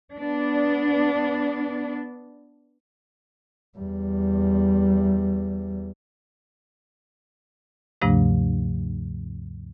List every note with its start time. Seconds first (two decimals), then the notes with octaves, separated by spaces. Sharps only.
0.15 B3 D4
3.78 E2 G3
8.01 D2 G2 C3 F3 A3 D4